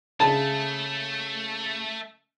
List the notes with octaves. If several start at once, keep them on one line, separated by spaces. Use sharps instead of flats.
C#3 A3 A5